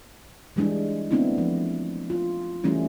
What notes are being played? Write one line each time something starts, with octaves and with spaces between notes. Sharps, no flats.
E3 G3 G#3 D4 E4
A3 B3 C4 D4 E4
F3
F4
E3 G3 A3 C#4 E4